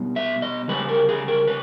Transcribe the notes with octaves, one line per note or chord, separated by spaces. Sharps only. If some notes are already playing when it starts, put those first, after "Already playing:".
Already playing: B2 G3
E5
D#5
C#3 G3 B4
A#4
G#4
A#4
B4